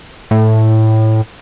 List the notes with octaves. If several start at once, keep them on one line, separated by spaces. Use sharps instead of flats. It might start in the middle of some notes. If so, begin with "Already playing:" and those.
A2